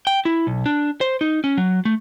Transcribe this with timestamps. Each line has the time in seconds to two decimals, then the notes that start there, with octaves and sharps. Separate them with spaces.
0.07 G5
0.25 E4
0.47 B1
0.66 D4
1.01 C5
1.21 D#4
1.44 C#4
1.57 F#3
1.85 A3